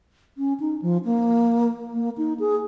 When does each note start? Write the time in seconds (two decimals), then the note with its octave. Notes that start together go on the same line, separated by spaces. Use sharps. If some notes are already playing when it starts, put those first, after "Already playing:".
0.38 C#4
0.60 D#4
0.82 F3
1.05 A#3
1.94 A#3
2.18 D#4
2.40 G#4